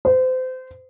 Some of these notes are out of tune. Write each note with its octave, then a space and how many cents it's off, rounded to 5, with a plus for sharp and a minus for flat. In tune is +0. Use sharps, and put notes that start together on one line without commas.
C5 -30